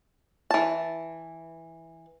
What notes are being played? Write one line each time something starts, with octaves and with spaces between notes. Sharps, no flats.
E3 A5